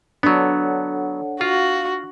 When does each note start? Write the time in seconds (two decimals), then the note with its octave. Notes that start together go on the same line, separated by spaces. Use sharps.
0.23 F#3 B3 D4 A4 C#5 F#5
1.41 F4 F#4 F5